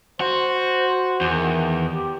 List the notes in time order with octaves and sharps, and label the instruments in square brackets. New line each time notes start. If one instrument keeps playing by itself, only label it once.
[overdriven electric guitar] F#4 [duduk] C5
[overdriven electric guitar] E2 [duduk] D#3
[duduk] G4